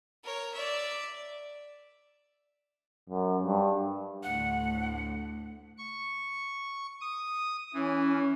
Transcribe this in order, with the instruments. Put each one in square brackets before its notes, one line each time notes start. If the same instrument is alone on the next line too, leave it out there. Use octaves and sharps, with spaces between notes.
[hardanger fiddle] A#4 C#5
D5 E5
[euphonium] F#2
G2
[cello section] D2 A2 A3 [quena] F#5
[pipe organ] C#6
D#6
[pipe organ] E3 [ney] C#4